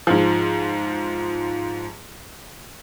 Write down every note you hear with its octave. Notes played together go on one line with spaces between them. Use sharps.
G#2 F3